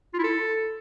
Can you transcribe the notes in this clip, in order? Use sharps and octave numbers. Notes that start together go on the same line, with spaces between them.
F4
E4
A4